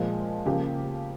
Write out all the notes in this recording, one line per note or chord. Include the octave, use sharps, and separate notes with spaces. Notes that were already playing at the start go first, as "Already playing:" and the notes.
Already playing: A#2 F3 G#3
C#3 F3 A#3 G4